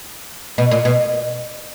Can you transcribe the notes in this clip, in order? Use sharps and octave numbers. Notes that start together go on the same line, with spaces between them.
B2
A#2
B2